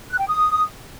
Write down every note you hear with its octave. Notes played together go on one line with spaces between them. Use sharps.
F#6
G5
D#6